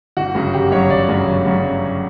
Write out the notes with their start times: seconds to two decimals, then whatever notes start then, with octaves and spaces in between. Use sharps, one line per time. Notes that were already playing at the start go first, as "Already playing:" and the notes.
0.17 G1 F#4
0.35 F#2 C#3 F#3
0.53 G1 G4
0.71 F#2 C#3 F#3 C#5
0.90 G1 D5
1.08 F#2 C#3 F#3
1.28 G1
1.46 F#2 C#3 F#3